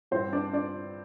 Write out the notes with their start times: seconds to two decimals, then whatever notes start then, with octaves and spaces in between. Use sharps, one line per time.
0.11 G2 E3 C4 C5
0.33 D4 D5
0.53 D4 D5